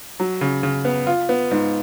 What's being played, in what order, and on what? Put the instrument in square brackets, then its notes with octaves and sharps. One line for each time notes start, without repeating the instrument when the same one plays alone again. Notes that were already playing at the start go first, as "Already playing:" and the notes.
[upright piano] F#3
C#3
C#3
B3
F4
B3
G#2